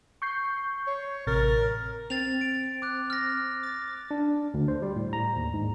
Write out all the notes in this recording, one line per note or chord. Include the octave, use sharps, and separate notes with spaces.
C#6 G6 C7
C#5
A1 C3 A#4 A6
C4 A6 F7
D7
D6 F#6
F6 A#6
A6
D4
D2
C5
G3
A2
A#5
D#2
G#2